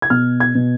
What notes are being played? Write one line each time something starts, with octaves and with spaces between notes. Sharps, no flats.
G#6
B2 F6
G#6
B2